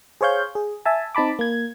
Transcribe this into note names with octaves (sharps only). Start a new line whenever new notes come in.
G#4 C5 C#5 F5 G6
G#4
E5 G#5 A5
C4 D#4 A5 B5 D6
A#3 G#6